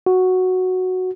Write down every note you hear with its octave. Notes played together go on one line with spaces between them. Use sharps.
F#4